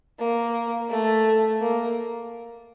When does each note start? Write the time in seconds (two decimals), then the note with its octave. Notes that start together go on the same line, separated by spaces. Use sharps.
0.19 A#3
0.89 A3
1.61 A#3